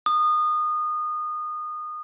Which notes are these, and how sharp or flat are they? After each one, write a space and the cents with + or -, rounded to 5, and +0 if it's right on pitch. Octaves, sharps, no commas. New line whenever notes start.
D#6 -25